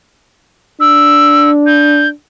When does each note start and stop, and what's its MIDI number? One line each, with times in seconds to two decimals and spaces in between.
0.80 2.11 62
0.80 1.50 88
1.66 2.08 91